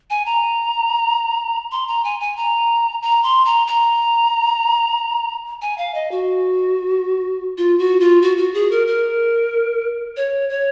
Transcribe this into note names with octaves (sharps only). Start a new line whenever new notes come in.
G#5
A#5
C6
A#5
G#5
G#5
A#5
A#5
C6
A#5
A#5
G#5
F5
D#5
F#4
F4
F#4
F4
F#4
F#4
G#4
A#4
A#4
C#5
C#5